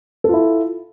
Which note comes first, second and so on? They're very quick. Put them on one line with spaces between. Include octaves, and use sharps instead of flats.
A4 F4 E4